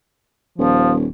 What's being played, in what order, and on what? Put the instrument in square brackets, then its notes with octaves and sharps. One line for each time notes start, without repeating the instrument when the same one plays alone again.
[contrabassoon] D#1 [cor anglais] F3